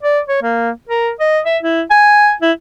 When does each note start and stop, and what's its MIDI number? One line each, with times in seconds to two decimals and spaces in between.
0.03 0.20 74
0.28 0.40 73
0.42 0.71 58
0.89 1.10 70
1.20 1.40 75
1.45 1.58 76
1.63 1.83 64
1.91 2.33 80
2.42 2.52 64